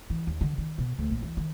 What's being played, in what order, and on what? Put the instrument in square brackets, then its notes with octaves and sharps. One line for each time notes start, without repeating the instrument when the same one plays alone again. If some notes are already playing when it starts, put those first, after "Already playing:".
[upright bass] E3
D#2
D3
D#3
B2
D2
A#1
E2
D#3